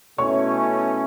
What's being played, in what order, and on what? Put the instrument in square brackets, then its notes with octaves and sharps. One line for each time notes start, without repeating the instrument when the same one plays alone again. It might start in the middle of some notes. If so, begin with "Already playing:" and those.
[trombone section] B2 A3 C#4 E4 [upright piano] C#5 C#6